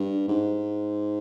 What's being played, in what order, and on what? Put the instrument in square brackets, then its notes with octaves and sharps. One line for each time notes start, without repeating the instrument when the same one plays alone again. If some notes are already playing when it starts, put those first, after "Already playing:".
Already playing: [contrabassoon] G2
G#2